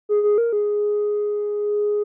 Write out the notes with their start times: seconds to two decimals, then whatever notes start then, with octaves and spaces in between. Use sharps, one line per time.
0.09 G#4
0.23 G#4
0.38 A#4
0.53 G#4